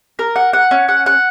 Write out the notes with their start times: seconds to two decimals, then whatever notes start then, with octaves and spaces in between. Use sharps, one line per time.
0.19 A#4
0.36 F#5
0.53 F#5
0.71 C#4
0.89 F#5
1.06 F#5